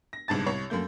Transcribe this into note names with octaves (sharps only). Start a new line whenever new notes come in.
A#6
G1 C2 G#2 A5 A6
C2 C#5
F#2 A3 A#3 G6